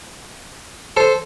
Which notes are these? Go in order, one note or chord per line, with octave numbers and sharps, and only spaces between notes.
A4 C5